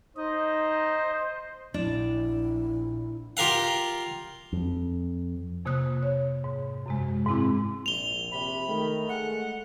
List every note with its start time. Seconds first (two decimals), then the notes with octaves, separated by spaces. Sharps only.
0.16 D#4 C5 D#5
1.74 A#1 D4 E4
3.37 F4 G4 A#4 F5 F#5
4.53 F2
5.65 F2 C3 A#3 D#6 F#6
6.03 C#5
6.44 G#2
6.86 F#2 C3 G#3
7.26 G#2 G#3 C4 E4 D6
7.86 A#1 F7 G7
8.32 C3 B5
8.69 D#3 A3
9.09 G#3 F#5